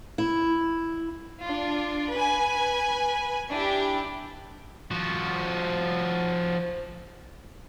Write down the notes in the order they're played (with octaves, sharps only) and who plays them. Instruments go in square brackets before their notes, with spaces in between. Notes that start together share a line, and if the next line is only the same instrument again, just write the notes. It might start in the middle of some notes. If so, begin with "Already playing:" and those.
[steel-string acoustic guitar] E4
[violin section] D4 F4
B4 G#5
D4 E4 G4
[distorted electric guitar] F3 F#4